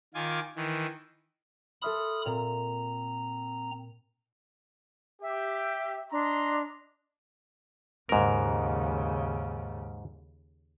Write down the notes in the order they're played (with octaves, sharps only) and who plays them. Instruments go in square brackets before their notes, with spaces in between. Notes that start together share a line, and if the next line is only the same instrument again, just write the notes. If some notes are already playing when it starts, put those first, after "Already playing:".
[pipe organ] D#3 F4 G#5 D6
D#3 E3
[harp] A4 E5 C6 [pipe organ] B5 D#6 F6
[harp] A#2 [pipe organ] C4 A#5
[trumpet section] G4 [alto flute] E5
[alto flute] D4 [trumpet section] D#5 A#5 C6
[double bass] D#2 C#3 [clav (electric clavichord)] G#2 A#4